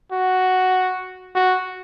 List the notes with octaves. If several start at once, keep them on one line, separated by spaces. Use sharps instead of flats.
F#4
F#4